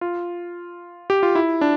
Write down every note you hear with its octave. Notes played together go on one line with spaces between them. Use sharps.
F4
G4
F4
E4
D4